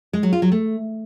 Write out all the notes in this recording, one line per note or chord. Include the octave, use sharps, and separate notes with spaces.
G#3
F#3
F4
F#3
A3